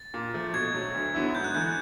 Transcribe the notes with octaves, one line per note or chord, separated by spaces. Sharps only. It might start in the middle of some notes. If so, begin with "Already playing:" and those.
Already playing: A6
A#2
F3 A3
B2 G#6
F#3 A3
D2
D3 F#3 B3 E4
G#2 G6
F#6
E3 A3 G6